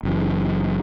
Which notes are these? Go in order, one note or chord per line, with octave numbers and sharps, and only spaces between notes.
F#1 F#2 E3